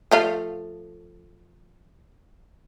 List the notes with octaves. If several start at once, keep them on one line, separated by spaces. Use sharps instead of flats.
F3 A3 F5